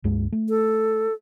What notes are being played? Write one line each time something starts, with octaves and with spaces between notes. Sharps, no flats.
C#2 G2 G#3
A3
A4